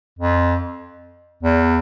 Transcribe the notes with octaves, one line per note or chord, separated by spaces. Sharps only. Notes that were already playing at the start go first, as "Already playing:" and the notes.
F2
E2